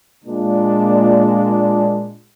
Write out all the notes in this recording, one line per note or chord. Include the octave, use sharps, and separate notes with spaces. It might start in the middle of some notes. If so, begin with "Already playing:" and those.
A#2 G#3 D4